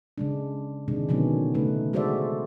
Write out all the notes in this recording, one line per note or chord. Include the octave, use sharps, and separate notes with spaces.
C#3 G#3 D4
C3 D#3 G#3 D4
B2 D3 D#3 F#3 B3 C#4
C#3 A3 D#4 B4
G#3 F#4 A4 C5 D5 E5